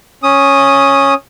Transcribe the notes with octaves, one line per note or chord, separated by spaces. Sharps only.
C#4 D#6